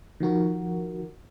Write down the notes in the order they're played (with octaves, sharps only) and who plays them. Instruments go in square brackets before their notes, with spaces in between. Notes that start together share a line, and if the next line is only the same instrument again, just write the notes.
[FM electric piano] D#3 F3 F#4 A#4